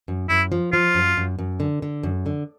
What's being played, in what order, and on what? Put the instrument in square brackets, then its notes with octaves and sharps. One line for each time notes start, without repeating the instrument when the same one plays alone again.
[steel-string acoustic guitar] F#2
[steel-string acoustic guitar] F#2 [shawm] E4
[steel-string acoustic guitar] F3
[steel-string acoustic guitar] F3 [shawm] F4
[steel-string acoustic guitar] F#2
F#2
F#2
D3
D3
F#2
D3